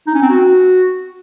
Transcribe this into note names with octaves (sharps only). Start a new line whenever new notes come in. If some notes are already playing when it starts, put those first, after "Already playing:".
D#4
C#4
C4
F#4